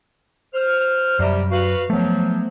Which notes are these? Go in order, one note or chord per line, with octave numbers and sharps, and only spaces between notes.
C5 F6
F#2 C3 G3
F#4 B4 F5
F3 F#3 A3 B3